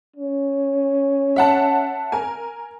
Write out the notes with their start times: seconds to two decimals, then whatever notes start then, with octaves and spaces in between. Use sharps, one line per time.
0.16 C#4
1.36 E5 F#5 A5
2.12 A#4 G#5